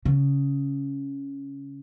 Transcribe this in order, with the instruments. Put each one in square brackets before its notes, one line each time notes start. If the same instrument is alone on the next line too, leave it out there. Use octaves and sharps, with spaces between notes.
[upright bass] C#3